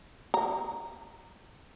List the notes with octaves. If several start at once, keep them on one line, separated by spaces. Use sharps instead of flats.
A#5